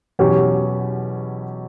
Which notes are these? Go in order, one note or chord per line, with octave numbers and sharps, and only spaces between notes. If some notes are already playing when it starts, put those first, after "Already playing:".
E2 B2 F#3 C#4 G4